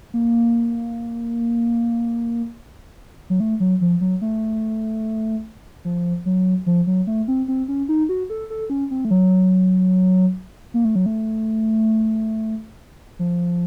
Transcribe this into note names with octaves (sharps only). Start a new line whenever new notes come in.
A#3
F#3
A3
F#3
F3
F#3
A3
F3
F#3
F3
F#3
A3
C4
C4
C#4
D#4
F#4
A4
A4
C#4
C4
A3
F#3
A#3
A3
F#3
A3
F3